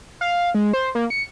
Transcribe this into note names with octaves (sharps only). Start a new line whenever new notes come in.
F5
G#3
C5
A#3
C#7